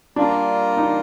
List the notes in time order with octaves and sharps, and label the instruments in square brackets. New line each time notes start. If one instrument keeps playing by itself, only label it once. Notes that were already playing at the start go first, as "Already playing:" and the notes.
[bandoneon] G3 A#3 F4 A#4 [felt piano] D4
[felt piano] D#4